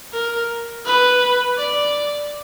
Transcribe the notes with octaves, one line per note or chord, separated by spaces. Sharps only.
A#4
B4
D5